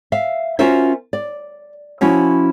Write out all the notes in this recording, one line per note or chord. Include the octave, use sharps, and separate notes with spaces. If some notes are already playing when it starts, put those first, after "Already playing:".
E5 F5
C#4 F4 F#4 A#4 C5 E5
D5
F3 C#4 E4 F#4